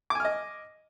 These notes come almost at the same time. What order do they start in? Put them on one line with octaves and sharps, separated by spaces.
D6 G#5 F6 D#5